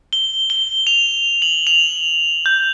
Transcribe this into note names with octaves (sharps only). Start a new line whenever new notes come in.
G7
G7
F7
F#7
F7
G6